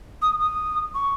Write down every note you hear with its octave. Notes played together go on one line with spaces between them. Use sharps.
D#6
D#6
C#6